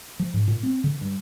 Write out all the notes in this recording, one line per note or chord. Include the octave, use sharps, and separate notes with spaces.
F3
G#2
A#2
C4
D3
G2